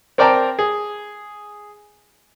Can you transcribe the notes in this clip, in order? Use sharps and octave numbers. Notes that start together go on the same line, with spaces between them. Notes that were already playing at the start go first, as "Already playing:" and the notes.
C4 A#4 D5 G5 A5 A#5
G#4